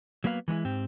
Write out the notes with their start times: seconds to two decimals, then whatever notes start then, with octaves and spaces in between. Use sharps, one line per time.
0.24 F#3 A#3 B3 B4 F5
0.48 E3 G#3 A3 E4
0.65 G#2 C4 G4